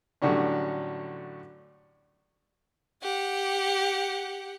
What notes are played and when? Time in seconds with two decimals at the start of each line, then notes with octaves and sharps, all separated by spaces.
0.22 A2 D3 F#3 G3 C#4
3.02 G4 F#5